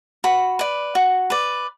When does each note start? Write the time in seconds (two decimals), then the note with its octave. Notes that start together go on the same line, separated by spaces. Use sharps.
0.24 F#4 B5
0.59 B4 D5
0.95 F#4
1.30 B4 D5